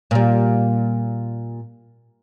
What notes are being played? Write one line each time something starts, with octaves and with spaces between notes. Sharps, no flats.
A#2 G3